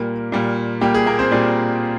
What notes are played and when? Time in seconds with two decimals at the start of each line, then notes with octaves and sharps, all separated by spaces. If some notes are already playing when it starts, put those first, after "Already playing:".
Already playing: A#2 G3 A#3 A#4
0.32 A#2 G3 A#3
0.81 A#2 G3 A#3 G4
0.94 G#4
1.06 A#3 A#4
1.19 C4 C5
1.31 A#2 G3 D5